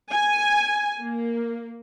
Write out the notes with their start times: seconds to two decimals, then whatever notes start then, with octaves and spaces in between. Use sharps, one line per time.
0.12 G#5
1.02 A#3